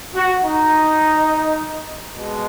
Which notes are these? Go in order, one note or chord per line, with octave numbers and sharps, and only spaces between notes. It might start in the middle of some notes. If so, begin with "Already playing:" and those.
F#4
D#4
B2 G#3